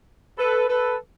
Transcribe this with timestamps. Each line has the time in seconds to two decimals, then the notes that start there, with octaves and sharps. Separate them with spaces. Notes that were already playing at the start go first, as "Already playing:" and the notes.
0.39 A4 B4
0.69 A4 B4